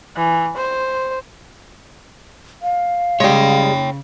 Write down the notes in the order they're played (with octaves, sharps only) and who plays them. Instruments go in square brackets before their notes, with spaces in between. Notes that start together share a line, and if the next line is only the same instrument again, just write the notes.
[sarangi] E3
C5
[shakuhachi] F5
[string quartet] C#3 [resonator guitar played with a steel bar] G3 G#3 [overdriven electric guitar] C#5 G5